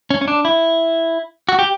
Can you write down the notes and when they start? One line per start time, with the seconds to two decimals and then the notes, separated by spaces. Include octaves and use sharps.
0.10 C#4
0.21 C#4
0.28 D4
0.45 E4
1.49 F#4
1.59 G4